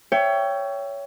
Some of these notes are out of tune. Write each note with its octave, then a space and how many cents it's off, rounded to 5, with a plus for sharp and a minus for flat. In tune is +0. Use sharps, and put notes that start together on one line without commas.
C#5 +20 E5 +25 G5 +0